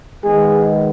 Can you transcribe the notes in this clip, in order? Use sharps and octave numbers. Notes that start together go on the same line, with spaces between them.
D#3 G#3 B3 G#4